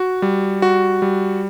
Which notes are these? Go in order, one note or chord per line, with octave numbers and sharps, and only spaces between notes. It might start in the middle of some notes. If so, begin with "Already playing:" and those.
Already playing: F#4
G3
F#4
G3